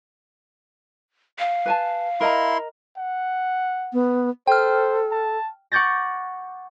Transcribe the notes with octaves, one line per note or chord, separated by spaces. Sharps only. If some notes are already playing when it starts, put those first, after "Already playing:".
F5
B4 G#5 A5
E4 A#4 D#5 A#5 C6
F#5
B3
A4 C5 G5 F6
A5
F#5 C#6 D6 G6 A6 A#6